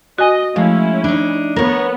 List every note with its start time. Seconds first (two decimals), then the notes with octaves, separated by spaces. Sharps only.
0.18 F#4 D#5 G#5
0.56 F3 G#3 A3 C#4 E4
1.04 D4 D#4
1.56 B3 A#4 C#5